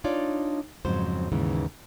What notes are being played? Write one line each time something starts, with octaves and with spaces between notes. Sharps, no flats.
D4 D#4 F4 C#5 D5
F2 G#2 C#3 F#3 C5
D#2 G#2 C#3 E3